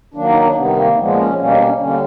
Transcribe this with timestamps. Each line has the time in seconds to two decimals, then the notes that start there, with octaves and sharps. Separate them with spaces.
0.14 D#3 F#3 A#3 D4
0.28 D#4
0.42 D4
0.56 C3 D#3 G3 B3
0.76 A#3
0.96 A#2 F3 G#3 B3
1.17 C#4
1.38 B2 G3 A#3 C#4
1.51 D4
1.65 C#4
1.78 D3 G3 A#3 C#4